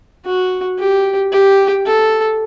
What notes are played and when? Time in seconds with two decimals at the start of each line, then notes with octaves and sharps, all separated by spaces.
0.25 F#4
0.79 G4
1.32 G4
1.86 A4